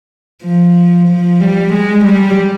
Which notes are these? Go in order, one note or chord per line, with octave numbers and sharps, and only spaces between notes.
F3
F3
G3
G#3
G3